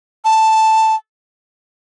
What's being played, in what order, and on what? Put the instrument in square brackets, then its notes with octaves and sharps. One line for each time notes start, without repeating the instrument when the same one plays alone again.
[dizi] A5